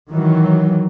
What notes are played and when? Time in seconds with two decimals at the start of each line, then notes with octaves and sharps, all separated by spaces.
0.11 D#3 E3 F#3